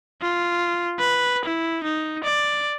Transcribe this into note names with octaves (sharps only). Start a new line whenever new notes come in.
F4
B4
E4
D#4
D5